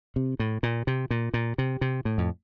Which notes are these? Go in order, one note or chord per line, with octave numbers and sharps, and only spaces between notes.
C3
A2
A#2
C3
A#2
A#2
C3
C3
A2
F2